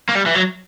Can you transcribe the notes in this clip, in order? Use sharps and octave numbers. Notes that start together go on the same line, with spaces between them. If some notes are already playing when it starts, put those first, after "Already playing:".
A#3
G3
E3
F#3